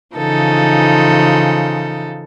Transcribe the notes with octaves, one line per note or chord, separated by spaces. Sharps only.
C#3 E3 F3 D#4 A4